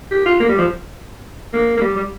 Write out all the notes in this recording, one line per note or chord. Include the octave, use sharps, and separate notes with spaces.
G4
F4
A#3
G3
F3
A#3
A#3
G3
G3